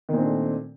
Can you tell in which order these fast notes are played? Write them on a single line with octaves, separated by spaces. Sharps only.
D#3 A#2 C4 D4 A3